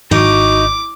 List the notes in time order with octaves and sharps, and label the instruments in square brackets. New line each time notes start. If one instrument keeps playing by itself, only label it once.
[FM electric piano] G#1 [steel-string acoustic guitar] D#4 [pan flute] F#4 [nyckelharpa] D6